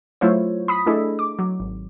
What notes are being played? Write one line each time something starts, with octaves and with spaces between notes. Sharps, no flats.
F#3 A3 E4 F4 C5 C#5
B5 D#6 B6
A3 D4 E4 G#4 A4 D#5
D6
F#3
G#1